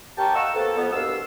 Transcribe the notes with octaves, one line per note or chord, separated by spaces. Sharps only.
D#2 G4 A#4 G5 A5 C#6
D#5 F5 F#5 C#6 E6
B2 A#3 C4 A4
F2 B3
C2 G2 B2 F5 E6